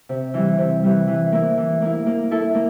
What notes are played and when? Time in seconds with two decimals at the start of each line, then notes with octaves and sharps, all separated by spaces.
0.09 C3
0.34 E3 G3
0.58 C3
0.83 E3 G3
1.07 E3
1.32 A#3 E4
1.57 E3
1.82 A#3 E4
2.06 A#3
2.31 E4 A4
2.55 A#3